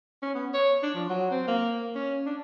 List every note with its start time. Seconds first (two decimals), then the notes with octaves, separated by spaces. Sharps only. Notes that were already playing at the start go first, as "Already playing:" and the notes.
0.22 C#4
0.34 B3
0.54 C#5
0.83 D4
0.94 F3
1.10 F#3
1.31 C4
1.47 A#3
1.95 C#4
2.26 D4